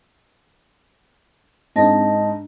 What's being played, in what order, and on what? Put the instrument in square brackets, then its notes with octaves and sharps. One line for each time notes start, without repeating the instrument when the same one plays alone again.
[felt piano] G#2 D#4 [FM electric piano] C4 D4 [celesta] D#5 A5 A#6